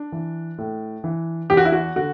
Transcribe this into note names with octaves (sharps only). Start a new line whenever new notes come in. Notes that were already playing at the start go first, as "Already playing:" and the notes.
Already playing: D4
E3
A2
E3
E2 G4
F#4
E4
F#4
D3 F#4